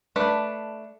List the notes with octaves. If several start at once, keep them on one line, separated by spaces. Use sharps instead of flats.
A3 D4 B4